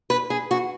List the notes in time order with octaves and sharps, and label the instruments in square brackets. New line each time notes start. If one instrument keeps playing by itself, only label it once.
[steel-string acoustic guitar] B4
G#4
F#4